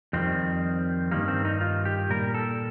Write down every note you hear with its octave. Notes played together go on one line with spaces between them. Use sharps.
F2 D#3 G3 C4
G2 D#3 G3 A#3
C4
D#4
F4
G4
A#2 G3 A#4
A4